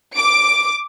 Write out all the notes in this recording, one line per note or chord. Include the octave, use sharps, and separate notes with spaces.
D6 D7